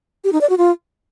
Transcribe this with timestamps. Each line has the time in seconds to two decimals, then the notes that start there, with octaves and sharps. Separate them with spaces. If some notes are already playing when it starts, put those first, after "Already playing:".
0.24 G4
0.33 D#4
0.41 D5
0.49 F#4
0.58 F4